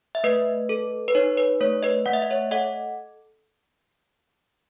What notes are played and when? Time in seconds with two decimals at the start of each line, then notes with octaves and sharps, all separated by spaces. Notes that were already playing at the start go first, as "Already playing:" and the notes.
0.15 E5
0.24 A3 B4 D#5
0.69 A4
1.08 B4
1.15 D#4 C#5
1.37 B4
1.60 A3 C#5
1.83 B4 D#5
2.06 A3 F#5
2.13 E5
2.22 D#5
2.30 C#5 E5
2.51 A4 D#5 F#5